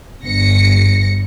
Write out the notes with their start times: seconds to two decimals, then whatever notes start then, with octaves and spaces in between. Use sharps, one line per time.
0.22 G1 A#6 C#7